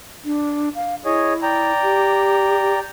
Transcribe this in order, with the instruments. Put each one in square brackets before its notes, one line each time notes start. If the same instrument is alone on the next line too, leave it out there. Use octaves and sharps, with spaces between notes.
[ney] D4
F5
[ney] E4 [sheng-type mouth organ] G#4 C#5 D#5
[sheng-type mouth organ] D5 G5 A#5
[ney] G4